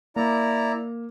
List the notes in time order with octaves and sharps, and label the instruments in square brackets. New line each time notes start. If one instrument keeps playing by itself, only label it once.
[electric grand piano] A#3 [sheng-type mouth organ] E4 D5 A#5